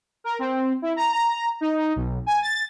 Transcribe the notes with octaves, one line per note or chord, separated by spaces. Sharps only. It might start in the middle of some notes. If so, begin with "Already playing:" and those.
A#4
C4
E4
A#5
A#5
D#4
B1
G#5
A6